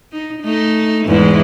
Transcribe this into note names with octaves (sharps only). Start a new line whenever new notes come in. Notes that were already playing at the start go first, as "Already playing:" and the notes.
D#4
A3 D#4
E2 G#2 E4